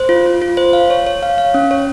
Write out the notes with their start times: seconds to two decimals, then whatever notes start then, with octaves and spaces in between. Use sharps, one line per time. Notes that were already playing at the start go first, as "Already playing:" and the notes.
Already playing: C5
0.09 F4
0.26 F4
0.42 F4
0.57 C5
0.73 F5
0.90 C#5
1.06 C#5
1.23 F5
1.38 F5
1.54 C#4
1.71 C#5